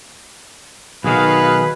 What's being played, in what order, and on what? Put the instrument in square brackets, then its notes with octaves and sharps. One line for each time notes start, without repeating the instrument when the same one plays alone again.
[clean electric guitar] B1 D#3 [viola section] F#4 F5 [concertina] G#4 [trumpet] B4